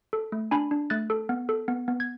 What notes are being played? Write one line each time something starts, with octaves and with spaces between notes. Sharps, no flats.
A4
A3
D4 G#5 B5
D4
A3 F#6 A6
A4
B3
A4
B3
B3
G#6